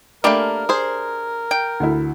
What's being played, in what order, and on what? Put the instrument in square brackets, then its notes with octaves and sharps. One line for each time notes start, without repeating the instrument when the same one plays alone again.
[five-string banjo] A3 A#3 [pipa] D4 G4 B5 [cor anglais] A#4
[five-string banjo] G#4 C5
[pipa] G5
[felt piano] D2 E4